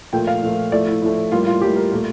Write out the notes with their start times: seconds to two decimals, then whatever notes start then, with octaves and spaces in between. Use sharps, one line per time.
0.13 A#2 F3 A3 G5
0.27 F5
0.43 A#2 F3 A3
0.72 A2 F3 A3 D5
0.87 E4
1.02 A2 F3 A3
1.32 A2 G3 A#3 F4
1.46 F4
1.61 A2 G3 A#3 G4
1.76 A#4
1.92 A#2 A3